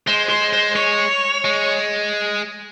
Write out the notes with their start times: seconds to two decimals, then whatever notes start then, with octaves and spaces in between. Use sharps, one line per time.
0.07 G#3 C5
0.29 C5
0.53 C5
0.76 C#5
1.45 G#3